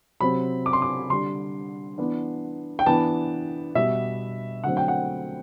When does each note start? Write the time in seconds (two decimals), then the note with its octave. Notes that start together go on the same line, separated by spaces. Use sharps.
0.20 C3 F#3 C4 B5
0.66 D6
0.73 C6
0.82 D6
1.09 D3 G3 D4 C6
1.98 E3 B3 D4
2.79 G5
2.86 E3 B3 D4 A5
3.75 B2 G3 B3 E5
4.64 D3 F#3 A3 C4 F#5
4.77 G5
4.88 F#5